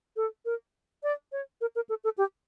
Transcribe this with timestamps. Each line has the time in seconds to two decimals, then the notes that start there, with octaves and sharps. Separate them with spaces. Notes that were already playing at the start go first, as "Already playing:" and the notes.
0.16 A4
0.45 A#4
1.03 D5
1.32 C#5
1.61 A#4
1.75 A#4
1.89 A4
2.04 A4
2.18 G4